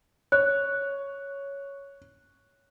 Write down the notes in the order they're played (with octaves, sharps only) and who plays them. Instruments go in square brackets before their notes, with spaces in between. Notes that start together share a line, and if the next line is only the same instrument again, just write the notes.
[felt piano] C#5 [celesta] F#6